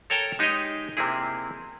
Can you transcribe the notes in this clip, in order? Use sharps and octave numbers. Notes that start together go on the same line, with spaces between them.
A4 A#4 C#5 G5 A5 A#5
G#3 D#4 G4 G#4 C#5 D#5
C3 A#3 C4 E4 G#4